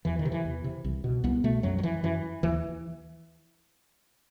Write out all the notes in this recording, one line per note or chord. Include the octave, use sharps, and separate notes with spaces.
E2 E3
D#3
C3
E3
E2
C3
C2
B2
C2 B3
B2 A3
F#2 F#3
F#3
E3
F#2 E3
D#2 E3